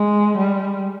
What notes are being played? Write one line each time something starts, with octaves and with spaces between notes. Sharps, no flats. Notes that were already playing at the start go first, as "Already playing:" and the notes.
Already playing: G#3
G3